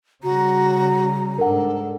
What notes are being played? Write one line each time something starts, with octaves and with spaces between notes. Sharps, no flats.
C#3 G3 F#4 A#5
G#2 D4 A4 A#4 F#5